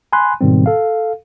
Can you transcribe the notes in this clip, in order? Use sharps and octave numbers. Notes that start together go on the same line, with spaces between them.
G#5 B5 C6 F#6
G#2 B2 D#3 G3 C4
A4 F5